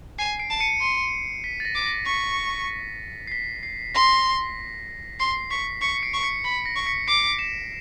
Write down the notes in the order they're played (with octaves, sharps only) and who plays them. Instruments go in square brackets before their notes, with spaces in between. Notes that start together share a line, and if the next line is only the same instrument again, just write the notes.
[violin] G#5 [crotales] C7
[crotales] C7 D7
[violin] A5
[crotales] C#7 D#7
[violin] C6 [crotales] C#7 D#7
[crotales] B6
A6
A#6
[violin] D6
[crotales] A#6
[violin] C#6 [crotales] B6
[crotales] C7
B6
C7
[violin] C6 [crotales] A#6
[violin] C6 [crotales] C7
[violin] C#6 [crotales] B6
[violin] C#6 [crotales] B6 C#7
[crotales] C7 D7
[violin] C#6
[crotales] B6 C#7
[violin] B5 [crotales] B6
[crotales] A#6
[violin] C#6
[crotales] B6 C#7
[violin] D6 [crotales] C7 D7
[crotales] D7 E7